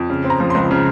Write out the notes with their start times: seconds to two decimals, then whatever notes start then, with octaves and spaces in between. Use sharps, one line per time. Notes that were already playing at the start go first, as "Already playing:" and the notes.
Already playing: F2
0.10 C#3
0.24 C4
0.30 A#5
0.40 F3
0.50 C#2 C6
0.71 C#3